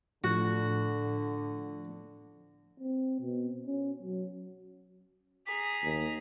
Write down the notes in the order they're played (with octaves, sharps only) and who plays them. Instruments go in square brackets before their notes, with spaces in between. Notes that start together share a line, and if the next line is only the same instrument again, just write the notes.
[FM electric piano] A2 F3 [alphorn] D3 [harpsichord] F#4
[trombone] C4
B2
C#4
F#3
[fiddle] G#4 A#5 [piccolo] B6
[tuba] D#2